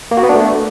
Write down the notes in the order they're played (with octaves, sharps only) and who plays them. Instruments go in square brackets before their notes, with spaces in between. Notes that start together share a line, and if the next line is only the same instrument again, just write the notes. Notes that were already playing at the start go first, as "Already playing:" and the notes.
[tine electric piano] A#3
F#4
B3
D4
A3